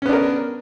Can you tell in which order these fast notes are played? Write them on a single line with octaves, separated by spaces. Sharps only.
C#4 B3 D4 A#4